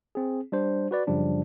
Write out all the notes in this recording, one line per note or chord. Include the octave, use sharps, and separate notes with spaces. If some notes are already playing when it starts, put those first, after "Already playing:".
C4 G#4
G3 D4 C5
F#4 B4 D5
F#2 C#3 F3 G3 D4